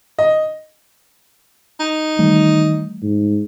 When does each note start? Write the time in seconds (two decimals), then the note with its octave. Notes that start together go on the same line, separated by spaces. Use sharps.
0.19 D#5
1.80 D#4
2.19 D#3 E3 G3 A3
3.02 G#2